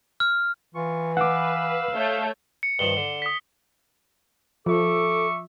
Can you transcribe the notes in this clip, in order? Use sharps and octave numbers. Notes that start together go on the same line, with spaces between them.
F6
E3 F4 C#6
B4 F5 F#5 D6 E6
A3 C#5 G6
C#7
G2 D#3 F3 G7
D3
D#6 B6
F3 A4 E5 C#6 D6